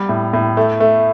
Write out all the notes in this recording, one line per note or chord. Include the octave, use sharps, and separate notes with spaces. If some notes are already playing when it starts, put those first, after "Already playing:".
Already playing: G3
A2
A2
A3
A3